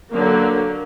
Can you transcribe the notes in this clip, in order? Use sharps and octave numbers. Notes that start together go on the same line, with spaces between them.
D3 F#3 A#3